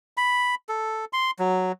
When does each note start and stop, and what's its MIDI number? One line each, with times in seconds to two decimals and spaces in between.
0.17 0.55 83
0.69 1.05 69
1.13 1.31 84
1.39 1.72 54